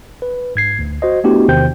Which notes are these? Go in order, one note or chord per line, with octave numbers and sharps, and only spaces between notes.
B4
G#2 G#6 C7
D2
F#4 C5 D#5
A3 B3 D4 E4 F#4 G4
E2 C3 D#3 C5 G5 G6